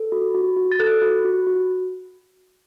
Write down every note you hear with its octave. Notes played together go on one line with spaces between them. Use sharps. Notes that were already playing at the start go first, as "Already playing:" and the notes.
Already playing: A4
F#4
F#4
F#4
A6
A4 F#6
F#4
F#4
F#4